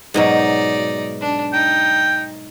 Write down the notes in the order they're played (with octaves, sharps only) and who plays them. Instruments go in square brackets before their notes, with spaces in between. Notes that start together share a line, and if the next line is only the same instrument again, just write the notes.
[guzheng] G#2 B2 F#3 [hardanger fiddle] D#4 D5
[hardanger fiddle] D4
[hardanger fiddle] D#4 [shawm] G5